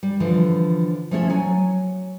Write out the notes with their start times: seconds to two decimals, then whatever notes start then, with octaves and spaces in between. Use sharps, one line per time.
0.03 G3
0.20 D3 E3 F3
1.11 F3 A3 C#4 E4 A4
1.30 F#3 G#5